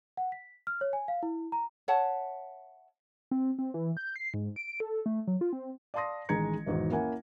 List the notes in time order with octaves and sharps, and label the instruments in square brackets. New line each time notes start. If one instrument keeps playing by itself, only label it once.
[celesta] F#5
B6
F6
C#5
G#5
F5
E4
A#5
[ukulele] C#5 E5 F#5 A5
[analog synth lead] C4
C4
E3
G6
C7
G#2
D7
A4
A3
F#3
F4
C4
[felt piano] D5 F5 A5 C6 D#6 A#6
A1 D#3 G#3 A#5 G#6 C#7
B1 E2 G#2 D#3 F#3
A#3 C#4 E4 A#4 F#5 G#5